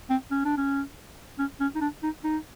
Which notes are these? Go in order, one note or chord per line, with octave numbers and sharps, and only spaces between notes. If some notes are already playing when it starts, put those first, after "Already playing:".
C4
C#4
D4
C#4
C#4
C#4
D#4
D4
D#4
D#4